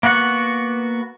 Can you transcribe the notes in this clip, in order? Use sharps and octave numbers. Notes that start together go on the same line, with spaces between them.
A#3 B3 F#4 F#5